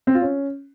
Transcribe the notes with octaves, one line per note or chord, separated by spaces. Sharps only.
C4
F4
C#4